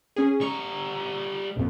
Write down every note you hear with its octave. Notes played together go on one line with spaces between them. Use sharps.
C#4 G#4
G3 A#5 C#6
A#1 F2